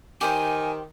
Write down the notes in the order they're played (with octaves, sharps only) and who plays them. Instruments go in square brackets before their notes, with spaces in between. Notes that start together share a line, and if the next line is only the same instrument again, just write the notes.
[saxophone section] D#3 [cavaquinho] G4 C5 [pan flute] G#5